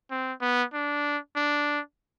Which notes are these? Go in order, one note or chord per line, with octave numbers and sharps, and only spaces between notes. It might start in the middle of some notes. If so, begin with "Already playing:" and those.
C4
B3
D4
D4